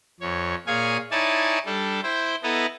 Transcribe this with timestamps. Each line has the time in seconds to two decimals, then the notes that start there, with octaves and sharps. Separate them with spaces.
0.20 F2 C#5
0.67 A#2 G#4 C#5 F5 G#5
1.11 D#4 E4 C#5 D5 G#5 A5
1.66 G3 D4 A4
2.03 E4 C5 G5
2.43 B3 E4 A4 B4 D#5 A#5